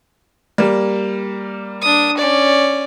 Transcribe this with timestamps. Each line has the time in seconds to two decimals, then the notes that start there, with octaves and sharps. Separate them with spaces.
0.58 G3 A#3
1.82 D4 D#6
2.17 C#4 D5